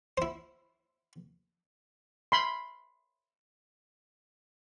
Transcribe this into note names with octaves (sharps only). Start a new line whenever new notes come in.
E4 C5
B5 C6